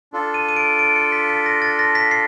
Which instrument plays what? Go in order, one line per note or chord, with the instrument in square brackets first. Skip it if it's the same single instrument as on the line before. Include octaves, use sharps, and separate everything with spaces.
[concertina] D4 F4 A4
[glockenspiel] D#7
D#7
D7
D7
C#7
B6
B6
A#6
A6
A#6
B6
C7